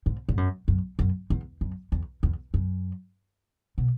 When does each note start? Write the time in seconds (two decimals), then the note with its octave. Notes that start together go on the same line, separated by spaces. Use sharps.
0.06 G#2
0.29 G#2
0.37 F#2
0.68 F#2
0.99 F#2
1.30 E2
1.61 F#2
1.92 E2
2.23 E2
2.54 F#2
3.78 B2